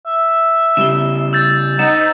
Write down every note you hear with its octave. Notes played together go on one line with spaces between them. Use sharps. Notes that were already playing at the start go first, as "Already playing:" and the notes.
E5
C#3 G3 E7 G7
E6 G6 A6
D#4 C5 F#5 E7